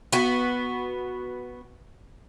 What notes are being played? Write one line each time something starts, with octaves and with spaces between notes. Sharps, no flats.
B3 F#4